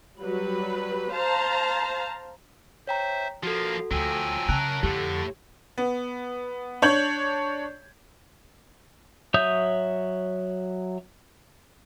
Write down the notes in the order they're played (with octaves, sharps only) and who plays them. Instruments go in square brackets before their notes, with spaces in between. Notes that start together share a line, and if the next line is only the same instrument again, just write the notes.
[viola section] F#3 G3 B4 B5
C5 F5 A5 A#5
[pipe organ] C5 E5 [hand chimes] C#5 G5 A#5
[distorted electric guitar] F3 A#3 [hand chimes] F#4 A4 [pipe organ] F5
[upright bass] D2 [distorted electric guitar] F3 F#3 [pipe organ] G5 G#5 E6
[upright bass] C#3 [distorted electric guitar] F#3 A#4 [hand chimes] A5 F#6
[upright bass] F2 [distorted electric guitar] A2 A3 [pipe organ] D3 [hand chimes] G4
[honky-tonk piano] B3
D4 C#5 G6 G#6 F#7
[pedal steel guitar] F#3 C#5 E5 D#6 G6